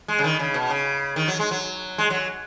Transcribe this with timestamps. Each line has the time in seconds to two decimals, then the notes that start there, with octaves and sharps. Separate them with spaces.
0.08 G#3
0.19 C#3
0.24 D#3
0.39 C#3
0.54 B2
0.70 C#3
1.16 D#3
1.28 F#3
1.39 G#3
1.51 F#3
1.98 G#3
2.10 F#3